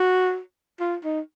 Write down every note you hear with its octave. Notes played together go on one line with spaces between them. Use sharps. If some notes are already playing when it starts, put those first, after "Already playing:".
Already playing: F#4
F4
D#4